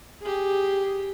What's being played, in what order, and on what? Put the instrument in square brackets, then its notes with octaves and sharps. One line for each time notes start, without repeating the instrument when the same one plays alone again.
[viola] G4 G#4